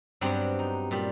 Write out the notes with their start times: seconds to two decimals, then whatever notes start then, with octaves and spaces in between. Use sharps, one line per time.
0.21 G2 F#3 G3 B3 C4 D4
0.59 D#4
0.91 A#2 G3